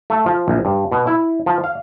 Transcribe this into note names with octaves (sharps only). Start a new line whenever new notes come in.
A3
F3
A#1
G2
B2
E4
F3
F5